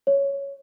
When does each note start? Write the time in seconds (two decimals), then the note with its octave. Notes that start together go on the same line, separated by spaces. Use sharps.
0.07 C#5